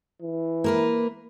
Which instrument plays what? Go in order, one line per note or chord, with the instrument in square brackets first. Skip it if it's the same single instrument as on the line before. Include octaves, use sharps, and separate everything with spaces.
[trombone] E3
[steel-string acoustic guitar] A#3 A#4 B4